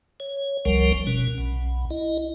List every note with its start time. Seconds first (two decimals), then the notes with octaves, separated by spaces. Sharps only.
0.20 C#5
0.65 F#1 C#2 F3 G3 A#4
1.07 B2 C#4
1.38 B1
1.90 E4 D#5